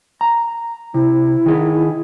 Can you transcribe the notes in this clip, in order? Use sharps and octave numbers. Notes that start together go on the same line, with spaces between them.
A#5
C3 E4
D#3 G#4